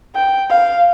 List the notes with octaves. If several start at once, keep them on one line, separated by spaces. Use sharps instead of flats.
G5
F5